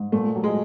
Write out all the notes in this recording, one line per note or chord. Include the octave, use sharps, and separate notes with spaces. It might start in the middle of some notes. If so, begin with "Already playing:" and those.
Already playing: G#2
A#2 A3
F#3
G#3